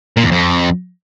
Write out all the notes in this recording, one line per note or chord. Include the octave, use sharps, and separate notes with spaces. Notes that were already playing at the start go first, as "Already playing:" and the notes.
A#2
E2
F2